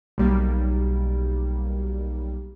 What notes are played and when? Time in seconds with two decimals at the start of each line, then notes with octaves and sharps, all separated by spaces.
0.18 B1 G3 A#3